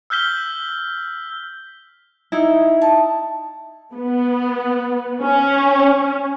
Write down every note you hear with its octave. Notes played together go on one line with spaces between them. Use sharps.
E6 F6 G6 B6 G7
D#4 E4
A5
B3
C#4